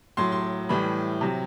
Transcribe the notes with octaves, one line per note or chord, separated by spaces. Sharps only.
A2 F#3 C6
C6
A2 E3 G3 B5
C3 F#3